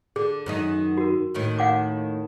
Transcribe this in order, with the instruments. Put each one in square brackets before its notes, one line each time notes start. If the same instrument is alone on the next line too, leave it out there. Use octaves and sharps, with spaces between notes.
[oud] D3 [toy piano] G#4
[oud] F#2 D#3 D#4
[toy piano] F#4 A#4
[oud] D#2 A2 D#3
[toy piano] F5 F#5 D6